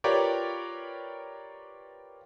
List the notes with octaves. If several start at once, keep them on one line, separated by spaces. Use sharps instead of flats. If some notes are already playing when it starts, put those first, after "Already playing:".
F4 G4 A#4 B4 C#5 D5